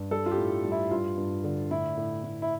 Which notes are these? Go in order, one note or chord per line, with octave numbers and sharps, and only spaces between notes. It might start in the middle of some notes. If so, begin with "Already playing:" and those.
Already playing: G2
G3 A4
F4
G4
A2
G3
E4
G2 F4
G2
D3
A2 E4
A2
A2
E4